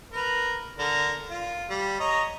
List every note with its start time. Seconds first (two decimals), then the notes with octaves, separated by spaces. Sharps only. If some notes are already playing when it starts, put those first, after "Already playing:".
0.13 A#4 B4
0.79 D3 D4 A#4
1.31 F4
1.70 G3
2.00 C#5 D#5 A#5